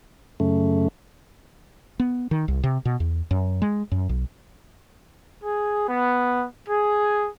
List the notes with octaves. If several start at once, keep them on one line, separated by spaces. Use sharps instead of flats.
F#2 C#3 A3
B3
D#3
C2
C3
B2
E2
F#2
G#3
F#2
B1
G#4
B3
G#4